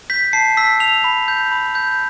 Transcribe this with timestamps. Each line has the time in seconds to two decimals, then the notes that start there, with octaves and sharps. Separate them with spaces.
0.10 G6 B6
0.33 A5 C7
0.57 E6 B6
0.80 E6 F7
1.04 B5
1.28 G6
1.52 B5
1.75 G6